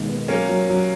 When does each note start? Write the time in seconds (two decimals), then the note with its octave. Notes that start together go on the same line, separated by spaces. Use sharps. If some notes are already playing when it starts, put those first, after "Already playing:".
Already playing: D#2 B2 D#3 G#3
0.08 B3
0.28 F#3 A#3 C#4
0.49 F#3
0.69 F#3